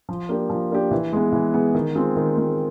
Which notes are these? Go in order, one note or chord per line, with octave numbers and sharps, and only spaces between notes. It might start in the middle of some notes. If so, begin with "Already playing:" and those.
F3
A#3 D4 G4
F3
A#3 D4 G4
E3
G#3 B3
E3
G#3 B3
D#3
G#3 C4 F4 G#4
D#3
G#3 C4 F4 G#4